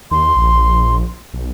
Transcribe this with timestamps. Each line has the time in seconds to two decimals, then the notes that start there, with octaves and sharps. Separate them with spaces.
0.11 D#2 C6
0.35 A#1
1.34 B1